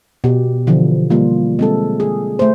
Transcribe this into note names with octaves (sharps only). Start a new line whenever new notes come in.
B2 G4
D3 E3 F3
G3 A#3 F4
G#3 C4 A4
G#4
A3 C5